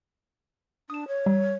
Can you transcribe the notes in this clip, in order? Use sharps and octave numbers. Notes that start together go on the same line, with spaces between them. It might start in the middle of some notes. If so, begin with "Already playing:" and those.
D4 D#6 E7
C#5
G3